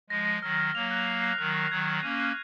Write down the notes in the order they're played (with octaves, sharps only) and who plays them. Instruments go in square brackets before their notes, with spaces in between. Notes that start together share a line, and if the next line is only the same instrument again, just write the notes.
[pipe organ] F3 G#3 [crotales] A#6
[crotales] A#6
[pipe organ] D#3 F#3 [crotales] F6
[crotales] F6
[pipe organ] F#3 A#3 [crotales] F7
[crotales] F#6
C7
C7
[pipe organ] D#3 F#3 [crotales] F#6
[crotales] C#6
[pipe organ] D#3 F#3 [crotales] G#6
[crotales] G#6
[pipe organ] A#3 C#4 [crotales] D#7
[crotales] F#6